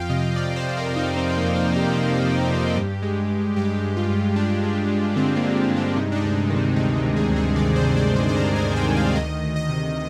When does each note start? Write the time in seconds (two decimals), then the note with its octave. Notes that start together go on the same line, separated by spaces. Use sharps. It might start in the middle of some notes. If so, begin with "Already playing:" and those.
Already playing: F2 F3 F5 G5
0.10 C3 D#5
0.36 F2 D5
0.56 C5
0.63 C3
0.77 A#4
0.90 C3
0.96 D#4
1.16 F3 C4
1.29 C4
1.37 A#3
1.43 F2
1.56 A#3
1.70 F2
1.76 G4
1.97 F2
2.23 F3
2.50 C3
2.77 G2
3.03 G#3
3.30 G2
3.56 G2 G4
3.84 G2
3.97 F4
4.10 G2
4.36 G2 D4
4.63 G#3
4.90 G#3
5.16 D3 C4
5.36 A#3
5.43 G#3
5.56 A#3
5.69 G2
5.77 D4
5.96 C3 D#4
6.12 D4
6.16 D#4
6.23 D2
6.36 D4
6.50 D#3
6.56 C4
6.76 D2 D#4
6.96 D#4
7.03 C3
7.16 G#4
7.29 D2
7.36 G#4
7.56 D#3 D5
7.76 C5
7.82 C3
7.97 D5
8.09 C3
8.16 C5
8.29 C5
8.36 D2 A#4
8.56 G#5
8.63 C3
8.76 G5
8.89 D#3
8.97 F5
9.16 D2 D#5
9.43 D2
9.56 D#5
9.69 C3